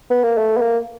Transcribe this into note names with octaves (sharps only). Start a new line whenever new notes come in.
B3
A#3
A3
B3
A#3